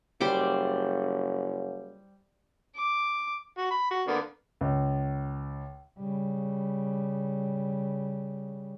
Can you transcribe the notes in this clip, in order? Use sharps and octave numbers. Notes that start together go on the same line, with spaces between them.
F#1 G3 C5 D6
D6
F#4
B5
F#4
D3 A#3 B3
C#2
C#3 G3